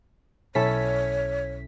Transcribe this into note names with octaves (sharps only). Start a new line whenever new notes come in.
B1 C#4 E4 A4 C#5 B6